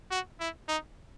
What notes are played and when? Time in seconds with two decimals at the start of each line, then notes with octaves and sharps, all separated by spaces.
0.11 F#4
0.40 E4
0.68 D#4